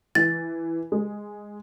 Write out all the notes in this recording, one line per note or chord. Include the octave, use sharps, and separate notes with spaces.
E3 A6
G#3